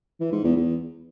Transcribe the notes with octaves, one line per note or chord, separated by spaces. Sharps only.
E3
G#2
E2
E2